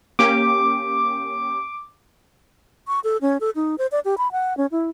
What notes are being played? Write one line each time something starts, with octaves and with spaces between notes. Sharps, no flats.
A#3 C#4 G4 D6
C#6
A4
C#4
A4
D#4
C5
D5
G4
B5
F#5
C#4
E4